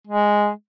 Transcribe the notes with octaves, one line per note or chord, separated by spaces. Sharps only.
G#3